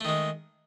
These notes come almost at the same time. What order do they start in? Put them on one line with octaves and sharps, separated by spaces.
A3 D#3 G#3